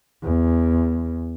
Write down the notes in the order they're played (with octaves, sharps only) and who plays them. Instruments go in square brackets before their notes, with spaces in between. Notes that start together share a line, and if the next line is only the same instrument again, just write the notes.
[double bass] E2